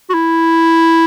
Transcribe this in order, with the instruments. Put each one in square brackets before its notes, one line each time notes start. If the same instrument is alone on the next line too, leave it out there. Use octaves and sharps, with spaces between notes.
[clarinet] F#4
E4